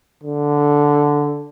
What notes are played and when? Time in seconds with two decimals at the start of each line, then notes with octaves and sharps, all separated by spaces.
0.23 D3